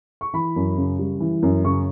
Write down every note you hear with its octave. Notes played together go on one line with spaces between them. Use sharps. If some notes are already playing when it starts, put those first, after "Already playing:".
C#6
E3 B5
F#2
C#3
G3
E3
F#2
C#3 C#6